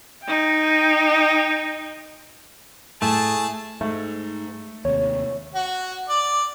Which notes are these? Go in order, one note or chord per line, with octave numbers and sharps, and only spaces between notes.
D#4 G5
A2 A3 G#4 A5
G#2 A3
D#2 C3 C#5
F#4
D5